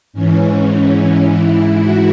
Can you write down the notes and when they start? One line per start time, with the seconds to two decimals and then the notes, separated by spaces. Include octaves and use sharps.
0.13 G#2 E3 C#4
1.24 G#2 E3 E4
1.80 F#4